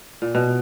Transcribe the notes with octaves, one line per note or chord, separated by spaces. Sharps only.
A#2
B2